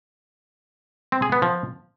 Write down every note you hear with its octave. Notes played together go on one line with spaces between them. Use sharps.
C4
G#4
B3
F3